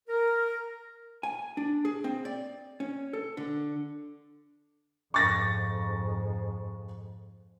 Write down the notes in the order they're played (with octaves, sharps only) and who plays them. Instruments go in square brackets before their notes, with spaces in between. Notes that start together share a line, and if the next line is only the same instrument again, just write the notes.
[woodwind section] A#4
[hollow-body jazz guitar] G#5
D4
G#4
C4
D5
C#4
A4
D3
[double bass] F2 G#2 [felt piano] C#6 A6 A#6